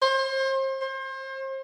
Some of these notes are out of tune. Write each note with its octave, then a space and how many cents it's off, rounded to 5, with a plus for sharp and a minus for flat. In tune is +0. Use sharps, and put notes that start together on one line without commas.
C5 +35
C5 +35